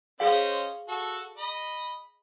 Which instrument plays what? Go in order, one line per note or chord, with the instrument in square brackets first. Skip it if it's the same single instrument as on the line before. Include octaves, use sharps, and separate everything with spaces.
[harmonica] C#4 C5 D#5 [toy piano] G#4 F5
[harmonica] F#4 A4
D#5 B5